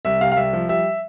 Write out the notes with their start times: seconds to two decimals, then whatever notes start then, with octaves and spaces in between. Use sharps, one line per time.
0.05 C2 E5
0.21 C3 F5
0.32 F5
0.37 C2 E5
0.53 F3
0.69 G3 E5